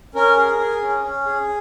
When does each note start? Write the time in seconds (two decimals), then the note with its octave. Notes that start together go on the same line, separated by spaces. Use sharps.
0.15 C#4 A#4
0.37 G#4
0.59 G#4
0.82 C#4
1.03 C#4
1.26 G#4